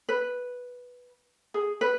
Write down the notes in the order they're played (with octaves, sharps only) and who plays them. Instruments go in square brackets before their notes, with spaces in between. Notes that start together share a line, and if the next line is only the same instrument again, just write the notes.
[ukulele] B4
G#4
B4